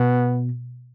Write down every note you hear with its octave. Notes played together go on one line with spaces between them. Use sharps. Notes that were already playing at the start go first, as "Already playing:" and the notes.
Already playing: B2 B3